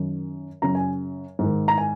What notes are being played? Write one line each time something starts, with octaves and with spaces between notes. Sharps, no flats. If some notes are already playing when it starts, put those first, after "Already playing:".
Already playing: F#2 D#3
F#2 C#3 A#5
G#5
G#2 D#3
A#5
G#5